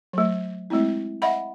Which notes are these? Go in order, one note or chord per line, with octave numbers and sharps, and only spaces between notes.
F#3 A3
G#3 A3 C4 E4
D#5 E5 F#5 B5